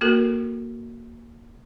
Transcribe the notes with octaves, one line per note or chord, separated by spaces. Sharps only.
A#3 F#4 A4 A#4